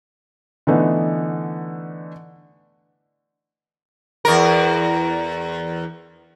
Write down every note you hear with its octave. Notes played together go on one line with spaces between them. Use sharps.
D3 E3 A3 B3 D#4
E2 A#4